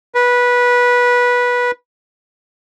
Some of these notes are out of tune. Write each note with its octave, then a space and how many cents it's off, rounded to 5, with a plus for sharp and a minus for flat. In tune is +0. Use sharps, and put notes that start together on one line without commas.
B4 -15